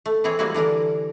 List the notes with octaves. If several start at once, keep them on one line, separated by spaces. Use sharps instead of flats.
A3
E3 C4 E4 G#4 C#5
G3 G#3 A#3 C4 E4 F#4
D3 E3 D4 A#4